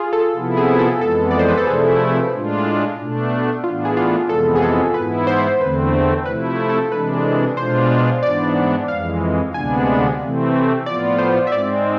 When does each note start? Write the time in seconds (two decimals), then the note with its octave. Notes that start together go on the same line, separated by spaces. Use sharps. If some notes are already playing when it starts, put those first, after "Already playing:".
Already playing: F4 G#4
0.13 A4
0.35 C3 F3 B3 E4
0.57 G#4
0.74 G#4
0.79 A4
1.00 F2 E3 G#3 B3 A4
1.31 D5
1.39 C5
1.49 B4
1.58 A4
1.66 C3 F3 A3 E4 G#4
2.32 A2 G#3 D4 F4
2.97 B2 A3 D4
3.63 A2 E3 B3 D4 F4
3.85 G#4
3.97 F4
4.28 F2 C3 E3 G#3 B3 A4
4.55 G#4
4.62 A4
4.94 G#2 E3 B3 E4 B4
5.27 C5
5.61 E2 D3 A3 C4 B4
6.25 C3 F3 A3 E4 B4
6.69 A4
6.91 C3 E3 G#3 D4 B4
7.57 B2 G#3 D4 F4 C5
8.23 G#2 E3 B3 D4 D5
8.88 F2 E3 G#3 F5
9.54 D2 C3 G#3 B3 D4 G#5
10.20 C3 E3 A3 C4
10.86 A2 F3 B3 F4 D5
11.18 C5
11.47 E5
11.52 G#2 G#3 C4 D5